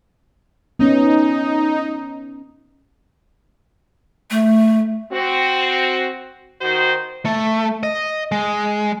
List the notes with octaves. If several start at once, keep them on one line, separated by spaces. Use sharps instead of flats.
B3 C#4 D#4
A3
C4 F#4
D#3 F#4 C5
A3
D#5
G#3